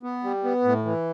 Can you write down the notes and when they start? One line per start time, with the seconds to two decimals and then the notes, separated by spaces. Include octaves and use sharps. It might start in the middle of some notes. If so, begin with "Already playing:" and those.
0.03 B3
0.24 G3
0.44 B3
0.64 A2
0.85 E3